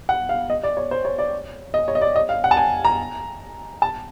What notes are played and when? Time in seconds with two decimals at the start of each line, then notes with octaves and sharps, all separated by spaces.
0.09 F#5
0.29 F5
0.50 D#5
0.63 D5
0.77 C#5
0.91 C5
1.05 C#5
1.18 D5
1.74 D#5
1.88 C#5
1.95 D#5
2.01 D5
2.16 D#5
2.29 F5
2.44 F#5
2.51 A5
2.57 G#5
2.85 A#5
3.82 A5